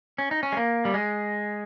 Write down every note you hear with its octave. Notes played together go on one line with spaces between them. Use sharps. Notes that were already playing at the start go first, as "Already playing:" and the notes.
C#4
D#4
C#4
G#3
A#3
G3
G#3